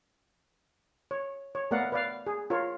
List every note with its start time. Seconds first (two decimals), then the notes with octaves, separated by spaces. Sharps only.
1.11 C#5
1.55 C#5
1.71 A3 B3 A#4 D5 F5 F#5
1.92 B4 D5 F5
2.27 G#4
2.50 F4 A#4 C#5